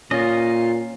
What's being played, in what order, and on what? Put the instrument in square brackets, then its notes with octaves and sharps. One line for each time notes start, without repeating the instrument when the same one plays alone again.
[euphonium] A#2 [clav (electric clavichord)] C#4 [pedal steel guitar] F4 D#5